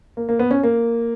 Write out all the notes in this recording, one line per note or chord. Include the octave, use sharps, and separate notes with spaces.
A#3
A#3
B3
C#4
A#3